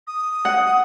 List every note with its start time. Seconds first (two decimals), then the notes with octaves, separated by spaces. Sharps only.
0.07 D#6
0.45 F#5